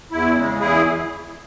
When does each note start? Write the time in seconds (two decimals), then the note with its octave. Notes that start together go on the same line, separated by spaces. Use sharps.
0.12 E2 E4
0.36 C#3 G#3
0.60 E2 E4 G#4